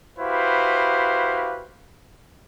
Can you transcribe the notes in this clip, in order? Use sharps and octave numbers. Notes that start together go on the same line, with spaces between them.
E4 F#4 G4 B4 C5 F5